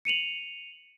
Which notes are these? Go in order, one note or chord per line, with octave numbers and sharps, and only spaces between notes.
C#7 D#7 F7 F#7